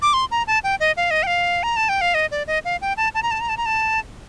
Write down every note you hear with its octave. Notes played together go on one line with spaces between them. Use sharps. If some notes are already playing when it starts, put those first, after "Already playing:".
D6
C6
A#5
A5
G5
D#5
F5
D#5
G5
F5
A#5
A5
G5
F5
D#5
D5
D#5
F5
G5
A5
A5
A#5
A5
A#5
A5
A#5
A5